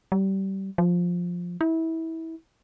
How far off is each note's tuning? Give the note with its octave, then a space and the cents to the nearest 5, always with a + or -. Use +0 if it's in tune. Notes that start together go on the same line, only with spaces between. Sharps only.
G3 -25
F3 +10
E4 -25